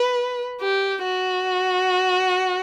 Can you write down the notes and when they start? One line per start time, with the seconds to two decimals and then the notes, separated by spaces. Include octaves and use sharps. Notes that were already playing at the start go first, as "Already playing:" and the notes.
Already playing: B4
0.61 G4
1.04 F#4